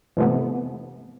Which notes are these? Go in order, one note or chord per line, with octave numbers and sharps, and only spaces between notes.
F2 G#2 C3 E3 A3 B3